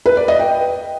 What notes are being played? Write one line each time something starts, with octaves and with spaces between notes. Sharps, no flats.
B4
D5
D#5
G5